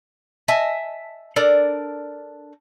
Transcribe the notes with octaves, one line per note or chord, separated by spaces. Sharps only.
D#5 E5 G#5 A5
D4 A4 A#4 D5